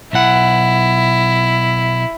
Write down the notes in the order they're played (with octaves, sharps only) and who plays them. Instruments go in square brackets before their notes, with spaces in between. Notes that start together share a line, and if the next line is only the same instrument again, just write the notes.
[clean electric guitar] B1 F#5 [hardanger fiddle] E4